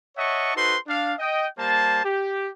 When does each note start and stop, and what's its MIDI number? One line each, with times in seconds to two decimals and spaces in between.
0.17 0.52 73
0.17 0.52 75
0.17 0.52 76
0.17 0.52 78
0.17 0.52 81
0.17 0.52 85
0.55 0.76 63
0.55 0.76 66
0.55 0.76 69
0.55 0.76 71
0.55 0.76 72
0.55 0.76 84
0.88 1.14 62
0.88 1.14 77
1.19 1.47 75
1.19 1.47 79
1.58 2.04 55
1.58 2.04 58
1.58 2.04 72
1.58 2.04 81
2.04 2.48 67